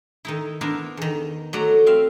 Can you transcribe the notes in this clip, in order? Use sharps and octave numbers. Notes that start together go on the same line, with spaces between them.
D#3 D#4 E4
B3 D4 E4 A#4 C5
E2 D#3
F#3 A3 B4 D5 F#5 A#5
C4 E5 F5